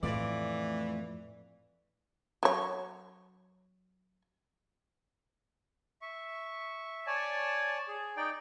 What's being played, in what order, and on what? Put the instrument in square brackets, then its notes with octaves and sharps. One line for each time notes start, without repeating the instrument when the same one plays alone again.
[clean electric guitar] F2 A3 F4 [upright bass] A2 [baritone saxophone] E3 [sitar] D5
[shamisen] F#3 C#5
[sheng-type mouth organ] E5 C#6
C#5 D5 G#5 A5
G#4
D#4 D5 G5